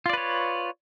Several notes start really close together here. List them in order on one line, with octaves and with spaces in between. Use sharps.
F4 D5 B4 C#5